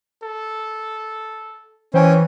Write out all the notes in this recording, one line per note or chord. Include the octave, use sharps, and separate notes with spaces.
A4
E3 C#4 E4 C5 G5 G#5